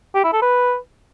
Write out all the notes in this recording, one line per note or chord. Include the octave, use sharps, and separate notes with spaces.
G4
E4
A4
B4